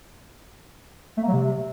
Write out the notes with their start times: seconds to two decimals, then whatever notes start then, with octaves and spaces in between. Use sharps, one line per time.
1.17 A3
1.23 A#3
1.28 F#3
1.33 C3